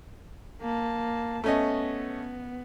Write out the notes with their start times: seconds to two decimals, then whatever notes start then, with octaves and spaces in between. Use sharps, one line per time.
0.61 A#3 A5
1.44 A3 B3 C#4 D#5